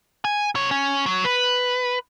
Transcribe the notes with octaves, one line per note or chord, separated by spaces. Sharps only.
G#5
C3 C#5
C#4
F#3
B4